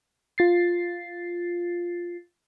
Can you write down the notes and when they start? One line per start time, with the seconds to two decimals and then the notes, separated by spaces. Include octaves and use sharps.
0.38 F4 A6 C7